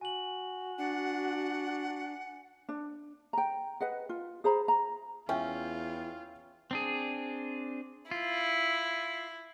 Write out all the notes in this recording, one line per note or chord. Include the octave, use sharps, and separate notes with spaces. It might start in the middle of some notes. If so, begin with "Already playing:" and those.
F#4 G#5 F#7
D4 F#5
D4
G5 A#5
B4 D#5 F#5
F4
G#4 C5 A#5 B5
A#5
E2 C#4 F4 E5 G5
C4 D4 G#4
E4 F4